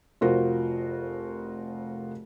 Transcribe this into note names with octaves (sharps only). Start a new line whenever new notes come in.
F1 F4 F#4 A#4 C5